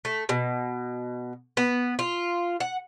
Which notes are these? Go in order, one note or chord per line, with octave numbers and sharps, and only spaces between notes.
A3
B2
B3
F4
F#5